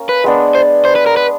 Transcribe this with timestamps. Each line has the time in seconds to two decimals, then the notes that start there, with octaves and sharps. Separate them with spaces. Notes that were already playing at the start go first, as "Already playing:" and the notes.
Already playing: A#3 C#4
0.09 B4
0.24 G#3 B3 D4
0.55 C5
0.85 C5
0.95 B4
1.06 A#4
1.17 B4